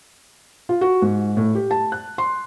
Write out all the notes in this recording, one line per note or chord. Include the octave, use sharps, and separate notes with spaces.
F4
F#4
G#2
A2
G4
A5
F#6
C6